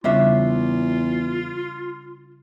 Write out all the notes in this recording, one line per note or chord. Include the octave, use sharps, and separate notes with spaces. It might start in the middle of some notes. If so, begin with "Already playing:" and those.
E2 C#3 G3 C#4 D4 F4 E5